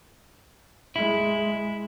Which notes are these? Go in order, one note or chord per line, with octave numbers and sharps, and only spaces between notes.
G#3 E4